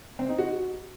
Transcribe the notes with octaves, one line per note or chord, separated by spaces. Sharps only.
C4
D#4
F#4